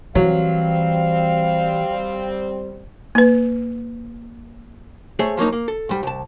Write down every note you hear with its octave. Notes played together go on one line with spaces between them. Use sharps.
E3 F#3 G3 C4 F5
A#3 B4
A3 G#4 C5 C#5
F3 F#3 A#3 D#4
A#3
A4
G#2 G3
C2 A5